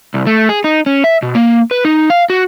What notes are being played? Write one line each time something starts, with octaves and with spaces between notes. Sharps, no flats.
C2
A3
G#4
D#4
C#4
E5
B2
A#3
B4
D#4
F5
F#4